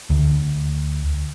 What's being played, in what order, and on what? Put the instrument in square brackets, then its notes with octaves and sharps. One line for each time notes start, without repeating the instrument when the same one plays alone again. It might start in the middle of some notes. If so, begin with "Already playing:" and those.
[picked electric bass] D2